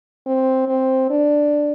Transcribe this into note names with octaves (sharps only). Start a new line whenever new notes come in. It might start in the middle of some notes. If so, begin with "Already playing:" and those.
C4
C4
D4